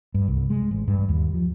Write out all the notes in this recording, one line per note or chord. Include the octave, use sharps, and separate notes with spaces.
G2
C2
G#3
A1
G2
D#2
F3